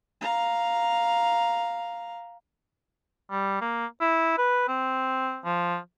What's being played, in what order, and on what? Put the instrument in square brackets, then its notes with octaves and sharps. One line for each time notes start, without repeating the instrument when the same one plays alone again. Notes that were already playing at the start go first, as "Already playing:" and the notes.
[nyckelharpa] F5 A#5
[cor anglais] G3
A#3
E4
B4
C4
F3